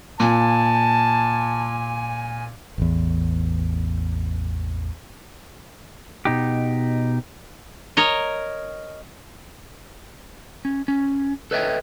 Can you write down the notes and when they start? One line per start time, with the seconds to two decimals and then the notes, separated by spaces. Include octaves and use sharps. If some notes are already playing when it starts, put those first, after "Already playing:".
0.20 A#2 G#5 A5
2.78 A1 E2
6.25 B2 D#4 G4
7.97 A#4 C#5 D#5
10.65 C#4
10.88 C#4
11.51 A4 B4 C#5 D#5 E5 G5